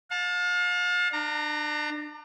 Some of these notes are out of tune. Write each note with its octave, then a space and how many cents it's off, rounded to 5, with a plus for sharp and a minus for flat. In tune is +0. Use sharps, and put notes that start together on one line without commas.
F5 +40 A5 +0
D4 +30 A#5 -15